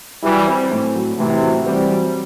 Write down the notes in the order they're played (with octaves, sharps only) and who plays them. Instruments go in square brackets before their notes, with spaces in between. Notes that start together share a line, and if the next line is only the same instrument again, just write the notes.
[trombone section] E3 G3 [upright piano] F#3
[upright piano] C4
A2
F#3
[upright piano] A2 [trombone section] C3 E3
[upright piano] F#4
[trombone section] E3 G3 [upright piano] C4
[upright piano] F#3